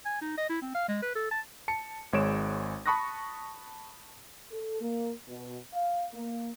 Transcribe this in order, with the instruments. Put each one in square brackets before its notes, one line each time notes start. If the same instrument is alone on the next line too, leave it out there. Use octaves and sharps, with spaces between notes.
[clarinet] G#5
D#4
D#5
E4
C4
F5
G#3
B4
A4
A5
[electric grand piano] A5 C#7
G#1 G#3 C#5 D7 E7
A5 B5 C#6 D#6 F#6 A#6
[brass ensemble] A4
A#3
B2
F5
A#3